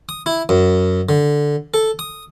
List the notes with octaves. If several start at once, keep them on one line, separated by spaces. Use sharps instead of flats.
D#6
E4
F#2
D3
A4
D#6